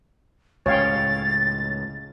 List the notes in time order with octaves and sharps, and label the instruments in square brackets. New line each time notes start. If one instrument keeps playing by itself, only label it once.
[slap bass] C#2 A2 [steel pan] C#5 F5 G5 [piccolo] A6